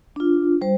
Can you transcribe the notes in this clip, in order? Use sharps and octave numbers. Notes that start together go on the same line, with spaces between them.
D4 F4
G3 C5